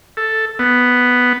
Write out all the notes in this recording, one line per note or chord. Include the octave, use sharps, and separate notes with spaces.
A4
B3